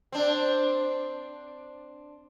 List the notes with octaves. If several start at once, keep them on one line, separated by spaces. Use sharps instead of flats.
C4 D4